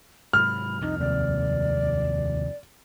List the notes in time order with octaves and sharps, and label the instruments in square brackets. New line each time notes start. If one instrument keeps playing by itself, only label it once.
[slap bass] G#2 C3 F#3 [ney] B5 [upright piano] F6
[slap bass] C2 F2 [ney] D#4
[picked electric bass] D#2 C3 [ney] D5